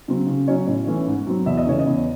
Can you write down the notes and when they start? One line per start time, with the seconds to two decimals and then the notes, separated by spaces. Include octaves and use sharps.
0.08 C#3 F#3 C4
0.27 C#3
0.48 F#3 C#4 C#5
0.67 A2 C#5
0.87 E3 A3 C#4
1.07 G#2
1.27 F#3 C4
1.46 E2 E5
1.57 D#5
1.66 C#3 E3 A3 C#5
1.79 D#5
1.86 E2